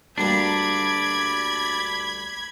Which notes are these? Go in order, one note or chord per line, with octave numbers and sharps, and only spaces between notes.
D2 G3 A#3 D4 D5 B5 D6 G#6